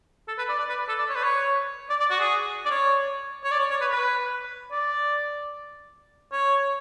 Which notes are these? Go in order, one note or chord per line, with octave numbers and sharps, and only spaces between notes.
A4
B4
D5
D5
B4
A4
D5
C#5
B4
C#5
D5
D5
F#4
G#4
D5
C#5
C#5
D5
C#5
C#5
B4
B4
D5
C#5